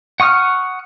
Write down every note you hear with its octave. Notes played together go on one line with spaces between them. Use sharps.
F#5 C#6 D#6 F6